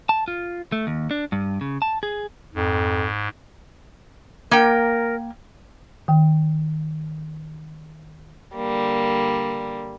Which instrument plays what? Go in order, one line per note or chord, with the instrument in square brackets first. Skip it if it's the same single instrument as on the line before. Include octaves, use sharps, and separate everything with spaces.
[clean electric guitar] A5
F4
A3
D#2
D4
G2
C#3
A5
G#4
[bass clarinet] F2 [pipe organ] G#2
[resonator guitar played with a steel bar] A#3 G5 [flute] A#4
[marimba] D#3 G5
[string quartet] D3 G3 A#3